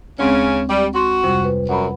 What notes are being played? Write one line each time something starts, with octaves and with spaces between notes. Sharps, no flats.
D2 C#3 G#3 C4 C#4
G3
F#4 C6
F2 C3 G3
B4
F#2 F#5 B5